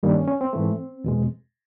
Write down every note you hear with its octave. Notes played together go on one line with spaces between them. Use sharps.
G2 D#3 G3 A#3
D4
C#4
C#4
C4
G#2 E3 A3
E2 B2 G#3